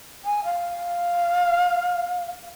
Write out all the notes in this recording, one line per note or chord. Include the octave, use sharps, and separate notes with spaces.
G#5
F5